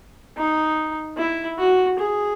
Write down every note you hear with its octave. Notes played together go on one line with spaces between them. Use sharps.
D#4
E4
F#4
G#4